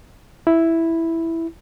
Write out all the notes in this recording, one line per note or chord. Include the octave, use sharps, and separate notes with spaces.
E4